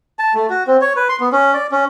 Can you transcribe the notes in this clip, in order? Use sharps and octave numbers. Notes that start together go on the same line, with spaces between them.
A5
A3
F#4
C4
C#5
B4
C6
B3
C#4
D5
C#4